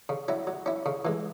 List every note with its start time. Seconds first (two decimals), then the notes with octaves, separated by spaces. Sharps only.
0.09 C#3
0.28 F#3 C#4 E4
0.47 F#3
0.66 C#4 E4
0.86 C#3
1.05 E3 G#3